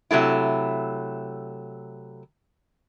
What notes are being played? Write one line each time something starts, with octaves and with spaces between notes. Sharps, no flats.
C3 F#3 A3 E4